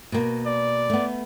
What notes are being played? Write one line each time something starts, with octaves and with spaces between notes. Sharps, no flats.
B2 A#3
D5
A3 B3